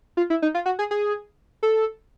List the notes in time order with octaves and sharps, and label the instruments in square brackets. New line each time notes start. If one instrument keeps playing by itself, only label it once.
[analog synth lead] F4
E4
D#4
F4
F#4
G#4
G#4
A4